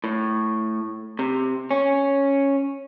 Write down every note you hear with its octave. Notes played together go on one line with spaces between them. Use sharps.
A2
C3
C#4